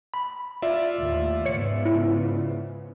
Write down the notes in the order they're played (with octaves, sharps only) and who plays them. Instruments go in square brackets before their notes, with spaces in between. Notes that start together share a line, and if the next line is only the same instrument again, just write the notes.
[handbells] B5
[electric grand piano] F4 D5 E5
[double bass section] D#2 A2
[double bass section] G#2 C#3 B3 [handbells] C#5 C#7
[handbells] E4